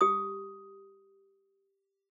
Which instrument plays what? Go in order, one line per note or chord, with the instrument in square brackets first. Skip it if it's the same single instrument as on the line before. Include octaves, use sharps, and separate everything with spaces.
[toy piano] G4 D#6